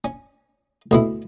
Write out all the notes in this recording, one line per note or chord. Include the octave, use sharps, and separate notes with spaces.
C#4
D2 B2 E4